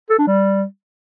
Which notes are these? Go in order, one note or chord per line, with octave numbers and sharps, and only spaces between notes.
A4
D4
G3